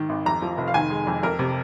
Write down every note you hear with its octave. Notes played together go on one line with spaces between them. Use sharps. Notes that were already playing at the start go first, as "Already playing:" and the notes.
Already playing: G#2 D#3
G#1
F2 A#5
F3
F1
F5
D#3 G#5
G#3
F2
F2 A#4
C3